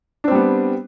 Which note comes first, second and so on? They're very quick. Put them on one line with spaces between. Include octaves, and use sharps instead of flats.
D4 C4 G3 B3